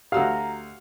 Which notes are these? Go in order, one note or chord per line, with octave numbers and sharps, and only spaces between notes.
D2 F#4 G4 F5 F#5 A#5 E6 F6